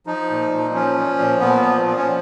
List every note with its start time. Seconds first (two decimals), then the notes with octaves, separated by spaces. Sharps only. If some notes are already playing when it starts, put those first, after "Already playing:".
0.07 F3 D#4
0.30 A#2
0.52 A#2
0.74 F3 C#4
0.97 F3
1.19 A#2
1.40 A#2 B3
1.63 F3
1.85 F3
1.97 C#4